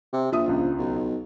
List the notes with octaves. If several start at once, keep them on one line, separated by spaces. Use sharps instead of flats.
C3
A#1 F3 E5 D#6
C#2 F3 F4
B1